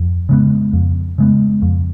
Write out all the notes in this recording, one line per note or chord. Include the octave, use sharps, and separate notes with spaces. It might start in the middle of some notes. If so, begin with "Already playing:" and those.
Already playing: F2
C#3 G#3 B3
F2
C#3 G#3 B3
F2